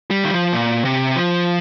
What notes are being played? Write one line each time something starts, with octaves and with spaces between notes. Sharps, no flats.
G3
D#3
F3
A#2
C3
F3